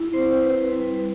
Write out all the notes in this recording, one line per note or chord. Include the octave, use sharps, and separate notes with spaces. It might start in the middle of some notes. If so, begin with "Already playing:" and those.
Already playing: E4
C4 C5
E4 B4
G3